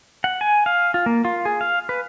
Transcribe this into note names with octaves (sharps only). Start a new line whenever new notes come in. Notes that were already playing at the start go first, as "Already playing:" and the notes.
F#5
G#5
F5
F4
A#3
F4
G#4
F5
B4